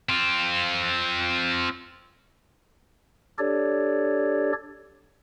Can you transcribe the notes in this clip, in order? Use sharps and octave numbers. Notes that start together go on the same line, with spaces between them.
C4 F4
D4 G4 A4 C#5 D5